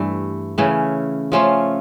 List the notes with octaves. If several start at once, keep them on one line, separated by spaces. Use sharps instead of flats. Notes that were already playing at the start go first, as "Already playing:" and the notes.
Already playing: G2 E3 A3
C#3 E3 A3 C#4
F3 A3 C#4 F4